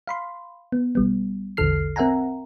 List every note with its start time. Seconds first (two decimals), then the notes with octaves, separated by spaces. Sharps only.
0.07 F5 B5 C6
0.72 B3
0.95 B1 G3 B3
1.57 A#1 E2 D3 A4 F6 C7
1.96 C4 A#4 E5 F#5 G#5 A#5